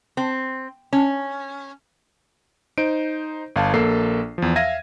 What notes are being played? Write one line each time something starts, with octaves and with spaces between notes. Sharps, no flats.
C4
C#4
D#4 C5 D7
G1 F5 A5
A#1 A#3 A4 C7
E2 F3
E5 F5 G#6 A#6 D#7